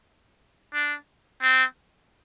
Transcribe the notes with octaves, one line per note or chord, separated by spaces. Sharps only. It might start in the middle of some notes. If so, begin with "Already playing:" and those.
D4
C4